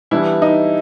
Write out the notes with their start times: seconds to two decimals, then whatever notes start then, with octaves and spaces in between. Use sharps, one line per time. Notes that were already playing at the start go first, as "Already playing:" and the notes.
0.11 E3 G3 B3 D4 E4
0.42 D#4